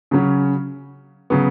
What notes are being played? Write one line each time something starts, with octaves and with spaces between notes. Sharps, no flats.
C#3 F#3 C#4
C#3 F#3 B3